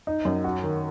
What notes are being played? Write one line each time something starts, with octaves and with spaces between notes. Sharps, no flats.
D#4
F#2
F#4
D#3